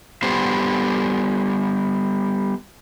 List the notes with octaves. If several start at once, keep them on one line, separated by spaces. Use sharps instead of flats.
G3 B3 C5